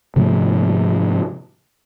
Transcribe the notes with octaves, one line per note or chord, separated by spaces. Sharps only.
G#2 C3 F3 A3